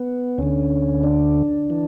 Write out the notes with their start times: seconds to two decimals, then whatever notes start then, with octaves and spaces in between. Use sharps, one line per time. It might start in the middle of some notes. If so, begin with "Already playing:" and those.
Already playing: B3
0.38 D2 D3 C#4
1.03 D4
1.70 E3